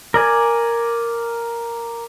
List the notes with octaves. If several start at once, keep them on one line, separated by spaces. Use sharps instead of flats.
A#4 D5 G#5